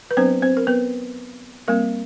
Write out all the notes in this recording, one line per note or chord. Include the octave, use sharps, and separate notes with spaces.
B4
F#3 B3 C4 D4 C5
C4 C5
A#4
B3 B4
G3 A#3 C4 A#4